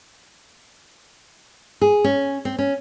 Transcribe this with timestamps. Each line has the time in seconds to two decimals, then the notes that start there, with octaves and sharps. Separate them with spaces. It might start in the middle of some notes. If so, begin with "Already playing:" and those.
1.81 G#4
2.04 C#4
2.45 C4
2.59 C#4